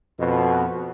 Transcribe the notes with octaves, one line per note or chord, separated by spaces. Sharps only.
F2 B2